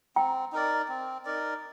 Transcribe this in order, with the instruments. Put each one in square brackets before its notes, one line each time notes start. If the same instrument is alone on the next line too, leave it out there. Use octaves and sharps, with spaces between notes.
[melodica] C4 [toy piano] G5 A#5
[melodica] D#4 A#4 D5
C4
D#4 A#4 D5